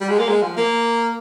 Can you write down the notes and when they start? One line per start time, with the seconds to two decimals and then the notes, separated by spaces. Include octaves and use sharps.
0.01 G3
0.09 G#3
0.19 A#3
0.29 G#3
0.43 F3
0.57 A#3